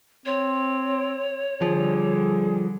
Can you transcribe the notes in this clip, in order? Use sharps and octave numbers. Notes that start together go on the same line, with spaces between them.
C4 C#5
D3 F3 G3 G#4